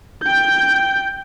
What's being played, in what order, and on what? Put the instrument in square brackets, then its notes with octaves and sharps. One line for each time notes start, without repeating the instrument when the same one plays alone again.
[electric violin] G5 G6